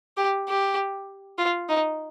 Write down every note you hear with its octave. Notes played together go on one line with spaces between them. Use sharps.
G4
G4
F4
D#4